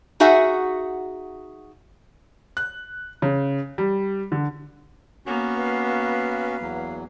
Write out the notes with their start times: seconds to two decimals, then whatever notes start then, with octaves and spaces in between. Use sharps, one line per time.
0.20 D#4 F#4 G#4 E5 F#5
2.57 F#6
3.22 C#3
3.78 G3
4.32 D3
5.26 A#3 B3 C#4 F#4
5.56 B4 F5
6.60 E2 F#3